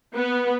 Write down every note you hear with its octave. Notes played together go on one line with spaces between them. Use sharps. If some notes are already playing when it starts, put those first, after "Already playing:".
B3